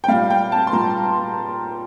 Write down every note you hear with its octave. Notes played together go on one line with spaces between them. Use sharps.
G5
A#2 G3 F5
G5
A5
C6
A#2 G3 A#5